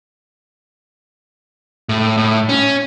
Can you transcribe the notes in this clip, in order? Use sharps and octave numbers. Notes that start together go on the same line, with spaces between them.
A2
A2
C#4